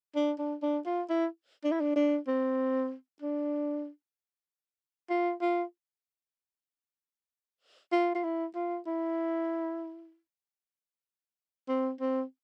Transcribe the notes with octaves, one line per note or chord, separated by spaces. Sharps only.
D4
D4
D4
F4
E4
D4
E4
D4
D4
C4
D4
F4
F4
F4
F4
E4
F4
E4
C4
C4